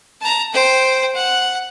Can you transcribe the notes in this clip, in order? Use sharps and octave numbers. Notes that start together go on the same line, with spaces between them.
A5 A#5
C5 G5
F#5